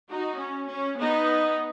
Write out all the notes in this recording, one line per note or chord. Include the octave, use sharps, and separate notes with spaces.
D#4 F#4
C#4
C#4
B3 D#4